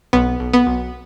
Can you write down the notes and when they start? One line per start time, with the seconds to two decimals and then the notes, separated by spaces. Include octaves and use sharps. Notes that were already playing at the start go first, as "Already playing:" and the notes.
0.13 B1 B3
0.40 B1
0.53 B3
0.67 B1